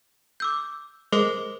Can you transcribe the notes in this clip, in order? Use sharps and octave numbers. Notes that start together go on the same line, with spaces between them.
D6 E6 G6
G#3 A#4 C5 D6